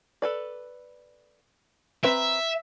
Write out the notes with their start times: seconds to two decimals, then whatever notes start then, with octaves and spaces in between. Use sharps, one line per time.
0.22 A4 B4 D5
2.04 C4 B4 E5 A#5